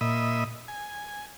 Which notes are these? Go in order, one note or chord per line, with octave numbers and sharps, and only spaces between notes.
A#2 D#5 E5 B5
G#5